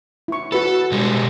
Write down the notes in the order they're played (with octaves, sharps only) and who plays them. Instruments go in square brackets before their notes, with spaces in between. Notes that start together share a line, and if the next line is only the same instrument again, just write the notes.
[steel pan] E4 C#6
[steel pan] F#4 B4 B5 [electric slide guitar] A4
[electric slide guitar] B2 G3 G#3